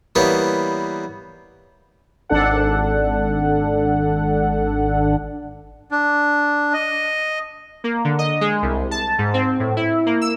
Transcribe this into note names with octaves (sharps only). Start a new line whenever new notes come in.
E3 G3 A#3 B3 C#5 D#5
G#1 D4 A4 F#5
D4
D#5
A#3
D3
D#5
G#3
C2
A5
G#2
C4
A2
E4
A#3
E6